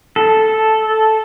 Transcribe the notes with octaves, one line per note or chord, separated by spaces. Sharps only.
A4